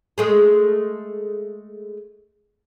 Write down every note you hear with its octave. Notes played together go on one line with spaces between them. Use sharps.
G#3 A3 G#4